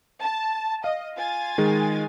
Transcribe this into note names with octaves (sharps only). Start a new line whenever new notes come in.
A5
D#5 F5
F4 G#5 A6
D#3 G#3